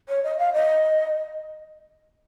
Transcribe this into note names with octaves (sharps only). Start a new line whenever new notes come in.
C#5
D#5
F5
D#5